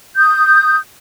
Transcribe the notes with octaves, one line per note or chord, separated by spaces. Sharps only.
D#6 G6